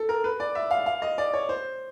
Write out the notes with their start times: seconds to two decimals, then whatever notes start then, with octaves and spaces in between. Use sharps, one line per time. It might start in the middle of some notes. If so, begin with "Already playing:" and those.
Already playing: A4
0.09 A#4
0.24 B4
0.40 D5
0.55 E5
0.71 F5
0.86 F5
1.02 D#5
1.18 D5
1.34 C#5
1.49 C5